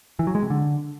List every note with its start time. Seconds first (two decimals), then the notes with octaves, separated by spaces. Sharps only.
0.19 E3
0.27 F#3
0.35 G#3
0.43 C3
0.50 D3